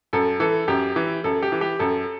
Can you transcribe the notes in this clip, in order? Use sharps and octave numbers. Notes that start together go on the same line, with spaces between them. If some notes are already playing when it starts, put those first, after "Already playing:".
F#2 A4
E3 A4
F#2 G4
E3
F#2 A4
G4
E3
G4
F#2 A4